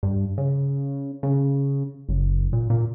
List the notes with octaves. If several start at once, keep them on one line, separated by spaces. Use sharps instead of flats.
G2
C#3
C#3
F#1
A#2
A#2